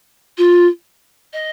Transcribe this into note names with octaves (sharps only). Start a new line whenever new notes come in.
F4
D#5